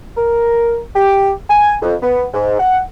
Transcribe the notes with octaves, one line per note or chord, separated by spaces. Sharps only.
A#4
G4
G#5
F2
B3
G#2
F#5